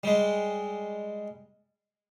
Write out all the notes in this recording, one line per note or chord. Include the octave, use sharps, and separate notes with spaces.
G3 G#3